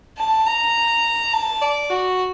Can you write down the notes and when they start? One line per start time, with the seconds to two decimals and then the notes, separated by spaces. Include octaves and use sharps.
0.18 A5
0.46 A#5
1.33 A5
1.62 D5
1.90 F#4